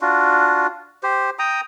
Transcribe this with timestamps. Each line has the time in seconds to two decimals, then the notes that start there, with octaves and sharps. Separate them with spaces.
0.01 D4 F4 F#4
1.03 G4 C5
1.39 G5 A#5 D#6